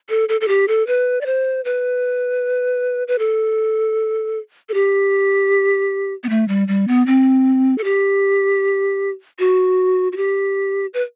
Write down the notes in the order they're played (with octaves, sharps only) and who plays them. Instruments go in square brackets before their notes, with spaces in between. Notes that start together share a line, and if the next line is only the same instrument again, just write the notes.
[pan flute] A4
A4
A4
G4
A4
B4
D5
C5
B4
B4
A4
A4
G4
B3
A3
G3
G3
B3
C4
A4
G4
F#4
F#4
G4
B4